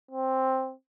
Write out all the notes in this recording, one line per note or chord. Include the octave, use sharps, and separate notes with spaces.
C4